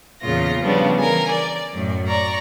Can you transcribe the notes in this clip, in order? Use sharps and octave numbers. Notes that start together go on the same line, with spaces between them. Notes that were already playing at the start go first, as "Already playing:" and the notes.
E2 A#2 C#3 F4 A#6
C#3 F3 G3 B3 D4
E3 A#4 G#5
D5
F#2 A2
D5 A#5 C#6